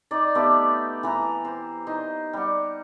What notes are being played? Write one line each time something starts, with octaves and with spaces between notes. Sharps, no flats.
D#4 D5
A3 B3 G4 B4
E3 B4 A#5
C5
D#4 C5
G3 F#5